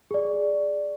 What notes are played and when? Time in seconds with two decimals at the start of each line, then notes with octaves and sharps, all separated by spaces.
0.11 G#4 D5